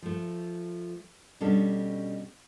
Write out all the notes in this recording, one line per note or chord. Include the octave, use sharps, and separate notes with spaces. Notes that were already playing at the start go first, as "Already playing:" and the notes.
F3 A3
B2 G3 C#4 D4 A4